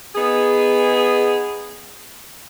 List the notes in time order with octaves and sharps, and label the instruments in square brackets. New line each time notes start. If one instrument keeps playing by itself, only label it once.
[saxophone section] B3 D#4 G#4